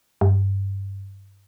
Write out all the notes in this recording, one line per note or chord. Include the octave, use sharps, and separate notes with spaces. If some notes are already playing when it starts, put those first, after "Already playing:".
G2